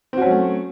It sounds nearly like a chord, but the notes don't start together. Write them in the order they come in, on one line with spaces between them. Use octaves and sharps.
C4 F#4 C#4 F#3 A3